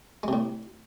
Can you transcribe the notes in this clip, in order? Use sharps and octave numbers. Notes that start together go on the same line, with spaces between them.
A2 C3 G#3